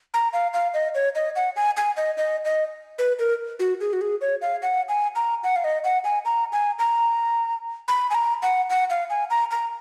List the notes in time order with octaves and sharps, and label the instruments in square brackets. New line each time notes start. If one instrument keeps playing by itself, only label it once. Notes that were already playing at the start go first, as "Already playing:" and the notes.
[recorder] A#5
F5
F5
D#5
C#5
D#5
F#5
G#5
G#5
D#5
D#5
D#5
B4
A#4
F#4
G#4
F#4
G#4
C#5
F5
F#5
G#5
A#5
F#5
F5
D#5
F#5
G#5
A#5
G#5
A#5
B5
G#5
A#5
F#5
F#5
F5
G#5
A#5
A#5